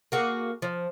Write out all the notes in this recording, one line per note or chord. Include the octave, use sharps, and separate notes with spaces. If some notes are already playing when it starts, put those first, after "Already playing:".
A#3 F#4 G#4
F3